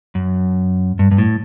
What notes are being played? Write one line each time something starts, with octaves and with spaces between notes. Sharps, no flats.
F#2
G2
G2
A2